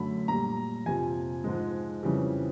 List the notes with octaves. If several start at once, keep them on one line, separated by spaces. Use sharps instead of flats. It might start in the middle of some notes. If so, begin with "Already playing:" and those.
Already playing: F#2 D3 F#3 A3 B5
A#2 G3 A#5
F2 C3 F3 G#5
G#2 F3 G#3
F2 C#3 E3 G3